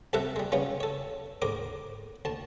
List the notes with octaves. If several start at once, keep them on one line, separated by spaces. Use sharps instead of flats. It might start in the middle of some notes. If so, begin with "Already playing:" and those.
C2 C3 A4 A#4 E5 F#5
G3 G#3
C#3 G3 B3 C#4 F4
A4 C#5
D2 G#2 A#4 D6
D2 A5